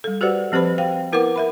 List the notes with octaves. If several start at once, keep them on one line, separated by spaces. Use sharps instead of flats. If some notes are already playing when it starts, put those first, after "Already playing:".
G3 A4
F#4 G4 B4 C5 D5 F#5
F3 C4 G4 B4 C5 B5
C5 F5 G5
B3 E4 A#4 B4 F#5 D6
A#4 E5 B5